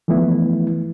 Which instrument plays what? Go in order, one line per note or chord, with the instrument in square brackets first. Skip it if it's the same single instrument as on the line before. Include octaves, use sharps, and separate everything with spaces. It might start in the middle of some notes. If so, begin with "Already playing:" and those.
[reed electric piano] E3 F3 A3 B3 E4